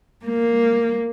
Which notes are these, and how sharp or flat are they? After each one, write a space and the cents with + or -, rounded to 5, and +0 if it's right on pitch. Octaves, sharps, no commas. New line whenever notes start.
A#3 -5